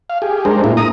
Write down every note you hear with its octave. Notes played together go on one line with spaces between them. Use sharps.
F5
G4 G#4
G#3 D4 A#4 C5
A2 A#3 E4 F4
A#5 D#6